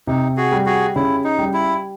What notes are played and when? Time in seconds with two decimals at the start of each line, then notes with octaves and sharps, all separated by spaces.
0.07 C3 D#4
0.37 F#4 G#4
0.52 G3
0.66 F#4 G#4
0.96 C#3 E4
1.24 D#4
1.38 G3
1.54 E4